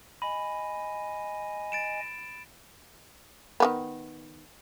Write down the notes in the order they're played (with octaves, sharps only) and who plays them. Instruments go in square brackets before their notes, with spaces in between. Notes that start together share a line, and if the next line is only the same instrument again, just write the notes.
[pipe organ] D#5 G#5 [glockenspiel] B5
[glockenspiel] A6 D7 E7
[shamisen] D#3 A#3 B3